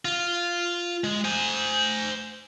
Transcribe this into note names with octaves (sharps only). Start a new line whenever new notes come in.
F4
G#3
C5 G#5